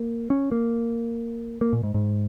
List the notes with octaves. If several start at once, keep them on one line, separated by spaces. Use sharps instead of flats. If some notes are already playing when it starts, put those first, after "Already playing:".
Already playing: A#3
C#4
A#3
A#3
A#2
G#2
G#2